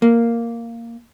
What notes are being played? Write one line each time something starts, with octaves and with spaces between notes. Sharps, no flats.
A#3